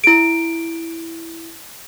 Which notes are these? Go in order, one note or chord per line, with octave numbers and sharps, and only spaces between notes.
E4 D7